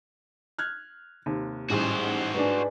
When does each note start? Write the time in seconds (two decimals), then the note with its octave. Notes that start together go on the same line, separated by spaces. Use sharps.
0.58 F6 F#6 G#6
1.26 D#2 C3
1.70 A1 G#2 G3 C#4 E4 F#4 C5
2.34 G#2 D4 B4 D5 G#5